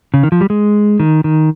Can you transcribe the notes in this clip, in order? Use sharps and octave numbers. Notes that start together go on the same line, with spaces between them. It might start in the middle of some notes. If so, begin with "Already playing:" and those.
C#3
D#3
F3
G3
G#3
D#3
D#3